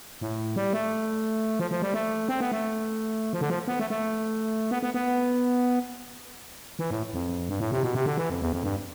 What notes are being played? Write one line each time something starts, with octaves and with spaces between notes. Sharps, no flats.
A2
G3
A3
F3
F3
G3
A3
C4
B3
A3
F3
D3
F3
B3
A3
A3
B3
B3
B3
E3
A2
F2
G2
A2
C3
B2
C3
D3
E3
F2
E2
F2
G2